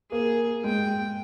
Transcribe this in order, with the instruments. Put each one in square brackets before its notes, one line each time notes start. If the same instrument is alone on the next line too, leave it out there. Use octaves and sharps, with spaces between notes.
[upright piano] A#3 [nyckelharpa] G#4
[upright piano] G#3 [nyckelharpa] G5